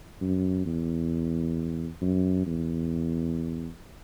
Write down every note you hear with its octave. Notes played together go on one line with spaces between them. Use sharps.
F#2
E2
F#2
E2